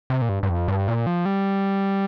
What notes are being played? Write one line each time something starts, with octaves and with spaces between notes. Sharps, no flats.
C3
A#2
G2
G2
F2
G2
A#2
F3
G3